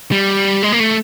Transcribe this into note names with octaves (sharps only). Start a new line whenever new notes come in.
G3
G#3
A#3
A3